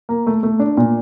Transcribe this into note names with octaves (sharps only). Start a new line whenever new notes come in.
A#3
A3
A3
D4
A#2